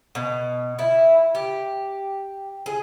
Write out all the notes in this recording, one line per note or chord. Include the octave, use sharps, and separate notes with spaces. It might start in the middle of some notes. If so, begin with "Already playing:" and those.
B2
E4
G4
G#4